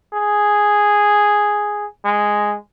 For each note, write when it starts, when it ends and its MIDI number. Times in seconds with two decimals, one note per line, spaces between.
0.13 1.86 68
2.05 2.55 56